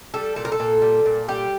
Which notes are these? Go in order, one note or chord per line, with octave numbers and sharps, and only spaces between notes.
G3 A4
A#2 A4
A#4
A4
A#2
G3
A#2
G3 G4